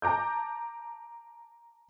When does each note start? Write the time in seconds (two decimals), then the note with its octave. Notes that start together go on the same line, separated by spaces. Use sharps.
0.02 A5 A#5 D6 G6